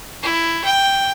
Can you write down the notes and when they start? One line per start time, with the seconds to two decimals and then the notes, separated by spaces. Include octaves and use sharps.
0.22 E4
0.64 G5